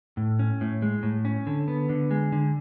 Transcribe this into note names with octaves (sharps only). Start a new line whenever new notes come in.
A2
C#4
A2
G#3
A2
C#4
D3
B3
D3
G#3
D3